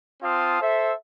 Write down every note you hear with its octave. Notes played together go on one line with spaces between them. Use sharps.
C4 F4 F5 A5 D#6
A4 C5 E5